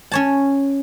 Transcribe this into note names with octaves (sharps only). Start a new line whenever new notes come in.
C#4 C#5 A5